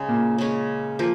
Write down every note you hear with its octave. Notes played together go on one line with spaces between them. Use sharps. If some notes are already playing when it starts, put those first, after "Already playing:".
Already playing: C#3 G#3 C#4
A#2 A#3
C#3 G#3 C#4
F3 A#3